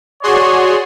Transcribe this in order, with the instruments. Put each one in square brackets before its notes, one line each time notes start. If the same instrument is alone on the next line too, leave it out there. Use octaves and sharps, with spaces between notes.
[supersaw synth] F#4 G#4 C6 [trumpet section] C#5 D5